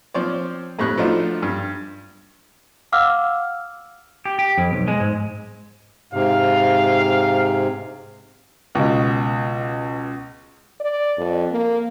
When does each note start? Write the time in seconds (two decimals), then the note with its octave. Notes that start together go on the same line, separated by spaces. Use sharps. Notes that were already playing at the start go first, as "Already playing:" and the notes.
0.14 F3 C4 C#5 D5
0.79 F2 A2 G3 C#6 F#6
0.97 F3 A3 D4 D#4 F4 F#4
1.42 G2
2.92 F5 F#5 D6 E6 F6
4.25 G4
4.39 G4
4.58 F2
4.73 B1
4.88 G#3
5.00 G#2
6.13 G#2 C3 F5
8.75 C#2 B2
10.80 D5
11.17 F2
11.51 A#3